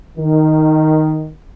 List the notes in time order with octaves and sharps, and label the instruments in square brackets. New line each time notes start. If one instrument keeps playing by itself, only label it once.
[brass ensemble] D#3